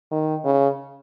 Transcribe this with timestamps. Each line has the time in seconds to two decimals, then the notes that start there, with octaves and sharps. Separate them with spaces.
0.12 D#3
0.45 C#3